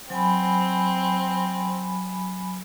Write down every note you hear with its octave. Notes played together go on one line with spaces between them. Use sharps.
F#3 C4 G#5 B5